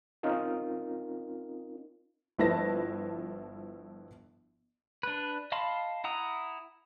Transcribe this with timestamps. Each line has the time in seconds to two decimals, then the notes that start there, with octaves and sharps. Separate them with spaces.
0.23 C4 C#4 D#4 F4 A#4
2.38 G1 F3 E4 B4 A5 A#6
5.03 D4 B4
5.52 D#5 F5 A5 B5 C6
6.04 E4 F#5 A#5 D#6